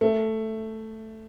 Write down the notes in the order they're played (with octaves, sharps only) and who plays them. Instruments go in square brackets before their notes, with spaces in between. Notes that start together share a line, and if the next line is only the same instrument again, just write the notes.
[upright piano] A3